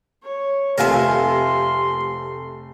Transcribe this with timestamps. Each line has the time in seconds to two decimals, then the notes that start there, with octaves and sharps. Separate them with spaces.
0.23 C#5
0.78 F1 C3 A3 F4 A#4 E5 G#5 C6